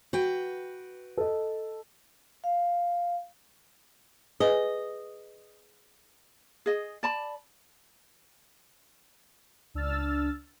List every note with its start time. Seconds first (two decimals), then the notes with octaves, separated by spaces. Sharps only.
0.13 F#4 B4 G5
1.17 A4 D#5
2.44 F5
4.40 G#4 B4 D#5 G#5
6.66 G#4 D#5
7.03 D5 A5 B5
9.74 C#2 D4 E6 F6 A6